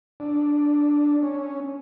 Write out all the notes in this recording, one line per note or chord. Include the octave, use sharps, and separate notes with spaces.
D4
C#4